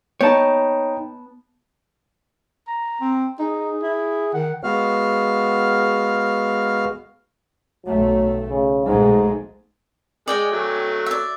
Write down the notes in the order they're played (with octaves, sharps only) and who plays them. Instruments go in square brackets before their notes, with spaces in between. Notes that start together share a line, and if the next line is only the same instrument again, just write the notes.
[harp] B3 A5 [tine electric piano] D#4 G5 [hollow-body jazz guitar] C#5
[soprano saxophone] A#5
[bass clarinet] C4
[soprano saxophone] D#4 [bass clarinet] G#4
[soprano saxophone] E4
[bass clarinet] D#3 [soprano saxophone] F#5
[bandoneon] G#3 B3 F#4 F5 F6
[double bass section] B1 A2 A3 [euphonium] F#3
[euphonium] C#3
[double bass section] B1 G#3 A3 [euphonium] G#2
[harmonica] G#3 [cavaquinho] D5 G5 G#5
[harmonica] F#3 A3
[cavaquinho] D5 E5